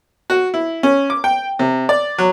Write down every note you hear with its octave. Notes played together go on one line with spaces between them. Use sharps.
F#4
E4
C#4
D6
G5
C3
D5
F#3